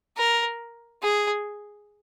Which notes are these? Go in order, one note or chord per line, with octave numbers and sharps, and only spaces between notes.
A#4
G#4